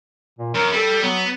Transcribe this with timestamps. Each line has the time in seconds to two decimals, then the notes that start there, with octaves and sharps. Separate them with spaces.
0.39 A#2
0.55 F#2 A#4
0.72 G3 A4
1.02 F#3 B3